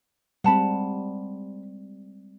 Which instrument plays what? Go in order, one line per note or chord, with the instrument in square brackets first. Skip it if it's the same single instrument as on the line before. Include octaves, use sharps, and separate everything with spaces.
[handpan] G3 G#3 C4 [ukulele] F#5 A5 B5